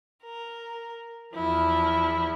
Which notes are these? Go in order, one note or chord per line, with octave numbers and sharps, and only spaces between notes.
A#4
E2 F3 E4